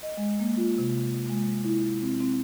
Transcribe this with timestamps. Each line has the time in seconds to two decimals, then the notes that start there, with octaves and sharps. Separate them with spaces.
0.03 D#5
0.17 G#3
0.40 A#3
0.57 F4
0.78 C3
1.29 G#3
1.64 E4
2.02 C4
2.20 C4